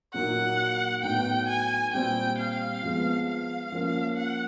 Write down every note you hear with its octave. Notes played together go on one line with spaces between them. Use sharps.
A#2 F#3 A#3 D#4 F#5
A2 F#3 B3 D#4 G5
G#5
A#2 G3 C4 G5
F5
F3 G#3 B3
F5
F3 A#3 C#4
F#5